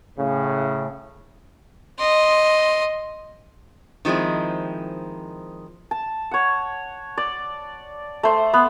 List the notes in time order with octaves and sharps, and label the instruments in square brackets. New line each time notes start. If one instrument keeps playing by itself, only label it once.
[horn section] A2 C#3
[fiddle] D#5 C6
[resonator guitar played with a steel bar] D#3 F3 G#3 C4 E4
[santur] A5
C#5 F#5
D5
A3 C5
B3